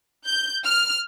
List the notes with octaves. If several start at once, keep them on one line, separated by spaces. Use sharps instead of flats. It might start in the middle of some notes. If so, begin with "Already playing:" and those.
G6
F6